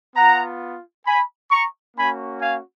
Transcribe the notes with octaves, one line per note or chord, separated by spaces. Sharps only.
B3 F4 F#5 A#5
G#5 B5
A#5 C#6
A#3 C#4 F#4 G#5 B5
F5 G#5